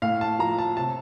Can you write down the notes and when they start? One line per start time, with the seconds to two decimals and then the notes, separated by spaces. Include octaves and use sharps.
0.02 A2 F5
0.21 A5
0.39 F3 A#5
0.58 A5
0.77 C3 A5